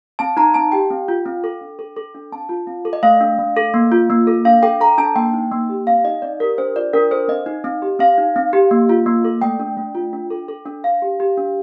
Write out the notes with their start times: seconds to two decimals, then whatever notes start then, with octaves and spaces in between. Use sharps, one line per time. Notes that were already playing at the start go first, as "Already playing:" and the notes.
0.19 C4 A5
0.37 D#4 A#5
0.54 C4 A5
0.72 G4 G5
0.90 C4
1.08 F4
1.26 C4
1.44 A4
1.61 D4
1.79 A4
1.96 A4
2.15 D4
2.32 C4 A5
2.49 F4
2.67 C4
2.85 A4
2.93 D#5
3.03 A3 F5
3.21 D4
3.39 A3
3.57 A4
3.74 A#3
3.92 F4
4.10 A#3
4.27 A4
4.45 D4 F5
4.63 A4 G5
4.80 A4 A#5
4.98 D4 A5
5.16 A#3 G5
5.34 D#4
5.52 A#3
5.69 G4
5.87 C4 F5
6.05 D#4 D#5
6.22 C4 D5
6.40 G4 A#4
6.58 D4 C5
6.75 F4 D5
6.93 D4 A#4
7.11 A4 C5
7.28 C4 D#5
7.46 D#4
7.64 C4
7.82 G4
7.99 C4 F5
8.18 D#4
8.36 C4
8.53 G4
8.71 A#3
8.89 F4
9.06 A#3
9.24 A4
9.42 A3 G5
9.59 D4
9.77 A3
9.95 F4
10.13 D4
10.30 A4
10.48 A4
10.66 D4
10.84 D4 F5
11.02 G4
11.20 G4
11.38 D4